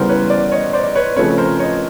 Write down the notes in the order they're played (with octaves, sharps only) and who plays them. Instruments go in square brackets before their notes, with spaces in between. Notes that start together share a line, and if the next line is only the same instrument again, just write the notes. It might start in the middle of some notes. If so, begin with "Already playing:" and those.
Already playing: [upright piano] C#3 E3 G3 B3 [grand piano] A#4 C5
[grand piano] B4 C#5
C5 D5
C#5 D#5
C5 D5
B4 C#5
[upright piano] C#3 F3 A3 C4 [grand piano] B4 C#5
[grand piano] A#4 C5
C#5 D#5